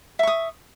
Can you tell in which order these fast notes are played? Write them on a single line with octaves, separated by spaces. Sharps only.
E5 C#6 D#6